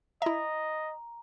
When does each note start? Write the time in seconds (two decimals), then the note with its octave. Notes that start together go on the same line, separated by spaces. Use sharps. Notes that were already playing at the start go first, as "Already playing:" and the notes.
0.22 E4 D#5 E5 A#5